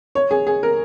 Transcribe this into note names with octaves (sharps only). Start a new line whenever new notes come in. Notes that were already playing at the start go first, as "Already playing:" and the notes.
C#5
G#4
G#4
A#4